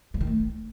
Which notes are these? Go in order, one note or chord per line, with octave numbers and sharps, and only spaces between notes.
F3
D#3
A3